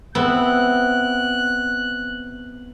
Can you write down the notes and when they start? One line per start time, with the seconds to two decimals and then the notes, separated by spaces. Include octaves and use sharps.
0.15 B3 C4 E4 F#6